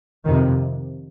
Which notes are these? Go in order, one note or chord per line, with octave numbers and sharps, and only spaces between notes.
F2 C3 D#3